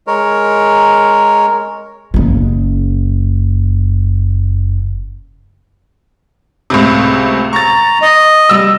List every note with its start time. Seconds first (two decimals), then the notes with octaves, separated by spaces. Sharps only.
0.07 G#3 A#4 C#5
2.14 F#1 C#3
6.70 C#2 A2 C3
7.53 A#5 C#6 A6
8.01 D#5
8.49 G3 E6